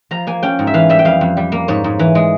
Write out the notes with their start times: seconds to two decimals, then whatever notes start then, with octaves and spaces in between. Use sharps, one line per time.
0.11 F3 A#5
0.27 A#3 G#5
0.43 C#4 G5
0.59 G#2
0.67 E5
0.74 E3 F5
0.89 G3 E5
0.99 G5
1.05 F2 F5
1.21 F2
1.37 G3
1.52 A#3
1.68 G#2 C#5
1.84 G#2
1.99 E3
2.15 G#3